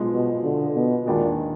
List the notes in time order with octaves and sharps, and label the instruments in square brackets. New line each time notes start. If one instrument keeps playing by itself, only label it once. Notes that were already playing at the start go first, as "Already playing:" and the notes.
Already playing: [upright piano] B1 A#2 F3 G#3 B3
[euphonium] B2
D3
B2
[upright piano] D#2 D#3 G#3 D4 G#4 [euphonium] A#2